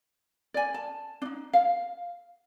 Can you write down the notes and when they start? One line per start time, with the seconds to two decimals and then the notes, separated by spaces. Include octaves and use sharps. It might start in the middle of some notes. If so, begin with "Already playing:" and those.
0.54 D5 G#5
0.74 A5
1.22 D4 D#4
1.53 F5